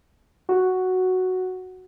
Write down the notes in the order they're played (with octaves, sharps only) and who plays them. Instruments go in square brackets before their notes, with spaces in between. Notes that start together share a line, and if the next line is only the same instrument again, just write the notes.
[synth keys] F#4